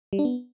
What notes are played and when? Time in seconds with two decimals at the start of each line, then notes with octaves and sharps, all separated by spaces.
0.13 G3
0.19 D4
0.25 B3